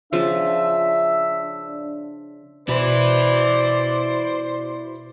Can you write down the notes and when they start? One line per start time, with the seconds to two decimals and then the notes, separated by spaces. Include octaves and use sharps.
0.13 C#3 F3 D4 E5
2.69 B2 E4 B4 C5 D5